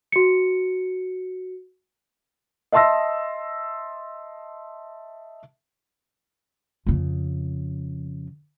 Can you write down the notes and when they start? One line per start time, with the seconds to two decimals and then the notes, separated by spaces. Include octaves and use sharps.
0.12 F#4 C#7
2.72 D#5 E5 A5 C6 E6 A#6
6.87 F2 C#3